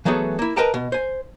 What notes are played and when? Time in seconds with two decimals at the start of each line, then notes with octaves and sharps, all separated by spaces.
0.05 E3 F#3 A3 B3 G#4 A4
0.39 A#3 E4
0.56 A#4 B4 D#5 G5 A5 A#5
0.74 B2
0.92 C5 G#5